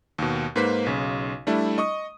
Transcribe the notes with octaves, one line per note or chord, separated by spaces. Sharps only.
D#2 B2
G#2 A#3 B4 C5 B6
B1 C#3
G3 A3 D4 E4
D#5 C#6 D#6